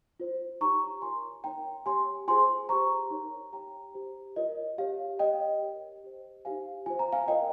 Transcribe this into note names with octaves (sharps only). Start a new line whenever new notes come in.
F4 C5
D#4 G4 C#5 A#5 C#6
F4 A#4 C#5 G#5 C6
D#4 A#4 C#5 G5 A#5
G4 C#5 G#5 C6
F4 G#4 C5 G#5 C6
G4 C5 A#5 C#6
D#4 A#4 C#5
G4 C#5 G5 A#5
G4 C5
F4 A#4 C#5 D#5
G4 C#5 F5
G4 C#5 D#5 G5
G4 A#4 C#5
G4 C5
D#4 G4 C5 F5 G#5
F4 C5 G#5
A#5
F5 G#5
F4 A#4 C#5 D#5 G5